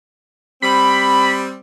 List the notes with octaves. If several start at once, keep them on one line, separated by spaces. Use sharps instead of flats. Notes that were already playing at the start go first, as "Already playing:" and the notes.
G3 C4 B5